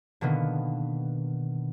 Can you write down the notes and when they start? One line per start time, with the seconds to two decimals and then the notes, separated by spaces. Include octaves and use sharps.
0.21 B2 D3 D#3 A#3 B3